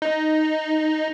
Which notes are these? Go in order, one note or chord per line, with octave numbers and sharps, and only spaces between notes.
D#4